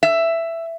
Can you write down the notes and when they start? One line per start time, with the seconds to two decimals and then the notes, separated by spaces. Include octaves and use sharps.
0.03 E5